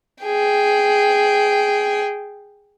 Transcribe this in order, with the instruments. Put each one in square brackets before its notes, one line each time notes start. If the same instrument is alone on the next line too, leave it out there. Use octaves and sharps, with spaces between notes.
[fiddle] G#4 G5